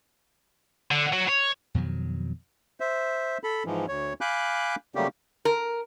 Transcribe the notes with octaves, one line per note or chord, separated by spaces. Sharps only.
D3
F#3
C#5
F2 B2 D#3 F#3
C5 E5
A4 B5
G#2 E3 F3
D2 C#5
F5 G#5 B5 D6 F#6 G6
C#3 F#3 G3 A3 A#3 G4
A#4